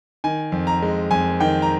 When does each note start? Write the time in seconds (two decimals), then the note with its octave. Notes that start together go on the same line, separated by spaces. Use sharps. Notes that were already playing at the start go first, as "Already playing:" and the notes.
0.24 D#3 G#5
0.52 F2
0.67 A#5
0.82 G#3
1.11 F2 G#5
1.40 D#3 G5
1.62 A#5